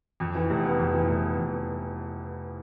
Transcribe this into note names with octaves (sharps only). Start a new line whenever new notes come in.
F2
E3
F1
B3
F2
E3
F1
B3
F2
E3